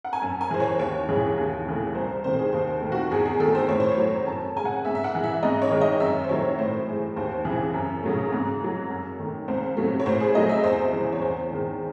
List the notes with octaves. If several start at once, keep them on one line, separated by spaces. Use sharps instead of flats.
F#5
G#5
F#2 A5
G#5
E3 G#3 C5
C#5
D#2 C#5
C#3 E3 G#3
D#2
C#3 E3 A3
C2 C5
C3 D#3 A3 C5
G#4
D#2 C5
D#3 A3
F#4
E2 G#4
G#4
D#3 A3 A4
C5
A2 C#5
C5
C#5
F#3 A3
F#2 A5
C#3 G#3 G#5
F#5
G#2 E5
E5
F#5
E3 G#3
E5
G#2 D#5
C#5
D#3 G#3
D#5
F#2 E5
C5
D#3 F#3 A3 C#5
A2 C5
E3 G#3
D#2 C5
C#3 E3
F#2
C#3 F#3 A3
G#2
F#3 A3
F#2
D#3 A3
C#2 C5
C3 F#3 A3
C#5
A2 C5
G#4
F#3 A3 D#5
E5
E2 C5
C#3 E3 G#3
C#5
E2 C5
D#3 G#3